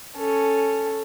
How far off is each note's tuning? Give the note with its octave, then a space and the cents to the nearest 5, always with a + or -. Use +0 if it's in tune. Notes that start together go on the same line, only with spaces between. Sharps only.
C#4 +0 A4 +0